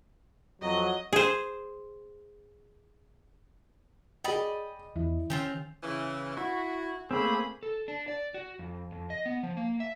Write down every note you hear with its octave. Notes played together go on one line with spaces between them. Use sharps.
F2 F#3 D#5
G#4 C5
G#4 D5 D#5 G5 B5
E2 E4
D#3 C4 C#4 F4 G4
C#3 E3
E4 F#4
A3 A#3 C4 G#4 B5
A4
D4
D5
F#4
F2
F2
D#5
B3
F3
A#3
E5